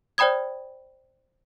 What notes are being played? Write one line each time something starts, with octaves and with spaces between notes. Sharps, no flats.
C5 D5 G5 B5 D#6 G#6